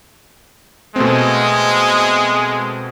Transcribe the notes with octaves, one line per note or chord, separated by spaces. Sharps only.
B2 G#3 A3 C4